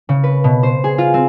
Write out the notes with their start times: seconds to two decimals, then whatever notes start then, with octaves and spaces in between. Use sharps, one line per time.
0.09 C#3
0.24 B4
0.44 B2
0.63 C5
0.84 G#4
0.98 F4
1.14 C4